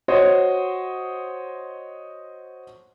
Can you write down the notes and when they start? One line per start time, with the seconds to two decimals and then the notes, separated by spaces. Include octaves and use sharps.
0.08 F#4 C5 C#5 D#5